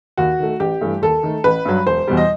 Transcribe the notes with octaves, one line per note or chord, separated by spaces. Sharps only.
D#2 F#4
D#3 A3
A1 G4
G2 E3 A3
D#2 A4
D#3 A3
A1 B4
G2 F#3
E1 C5
E2 B2 G3
D#5